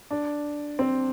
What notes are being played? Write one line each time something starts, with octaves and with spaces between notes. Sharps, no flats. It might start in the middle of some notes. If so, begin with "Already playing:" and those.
D4
C4